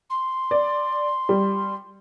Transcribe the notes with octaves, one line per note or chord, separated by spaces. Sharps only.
C6
D5
G3